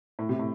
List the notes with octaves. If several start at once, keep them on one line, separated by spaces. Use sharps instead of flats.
A2
C3
A2